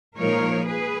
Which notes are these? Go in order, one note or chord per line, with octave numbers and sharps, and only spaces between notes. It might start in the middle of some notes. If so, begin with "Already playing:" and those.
A#2 F3 G#3 D#4 A#4 C#5
G#4 B4